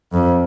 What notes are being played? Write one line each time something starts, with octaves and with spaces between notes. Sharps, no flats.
F2